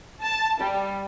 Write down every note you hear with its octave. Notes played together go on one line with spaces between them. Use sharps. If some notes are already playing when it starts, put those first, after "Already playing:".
A5
G3